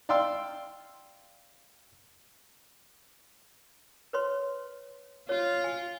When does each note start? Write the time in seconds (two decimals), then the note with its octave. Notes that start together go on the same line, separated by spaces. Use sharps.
0.09 D5 F5 G5 C6 E6
4.13 B4 C#5 C6
5.29 F4 C#5
5.64 G#5